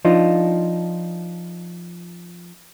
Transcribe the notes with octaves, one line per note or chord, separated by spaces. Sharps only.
F3 D4 D#4 F4